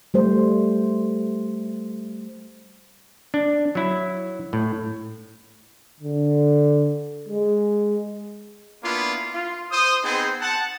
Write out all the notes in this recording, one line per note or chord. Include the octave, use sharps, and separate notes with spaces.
G3 A3 C5
D4
F#3 E4
A2
D3
G#3
A#3 B3 D4 E4 F4
F4
C5 D#6
B3 C4 D#4 G#4 C5
F#5 A5